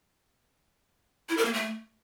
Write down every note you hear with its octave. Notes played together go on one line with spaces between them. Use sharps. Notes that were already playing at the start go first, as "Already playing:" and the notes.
E4
A#4
A#3
A3